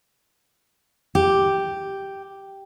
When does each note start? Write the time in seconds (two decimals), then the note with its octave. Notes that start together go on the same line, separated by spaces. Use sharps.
1.15 G4